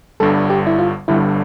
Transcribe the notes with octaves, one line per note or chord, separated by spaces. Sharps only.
G1 G2 D3 G3 A4
G4
E4
F4
G1 G2 D3 G3 E4